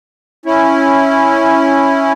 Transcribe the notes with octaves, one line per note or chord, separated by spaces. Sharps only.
C#4 E4